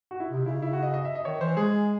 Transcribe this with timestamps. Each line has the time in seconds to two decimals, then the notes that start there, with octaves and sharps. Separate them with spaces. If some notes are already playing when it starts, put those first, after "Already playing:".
0.11 F#4
0.20 E4
0.31 C3 D#4
0.46 C#3 E4
0.62 E4
0.73 F#4
0.83 D#5
0.94 D#5
1.05 E5
1.15 D#5
1.25 D#3 C#5
1.41 E3 C5
1.57 G#3 G#4